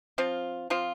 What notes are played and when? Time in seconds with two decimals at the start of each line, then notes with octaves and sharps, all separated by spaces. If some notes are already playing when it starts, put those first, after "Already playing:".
0.18 F3 C4 F4
0.70 F3 C4 F4